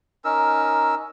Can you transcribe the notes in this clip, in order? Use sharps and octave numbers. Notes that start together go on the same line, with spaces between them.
C#4 D#4 A#4 E6